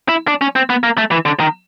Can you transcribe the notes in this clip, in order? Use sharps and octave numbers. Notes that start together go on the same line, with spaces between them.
E4
D4
C#4
C4
B3
A#3
A3
E3
D3
D#3